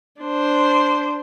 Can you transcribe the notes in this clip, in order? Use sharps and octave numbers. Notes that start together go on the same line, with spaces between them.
D4 C5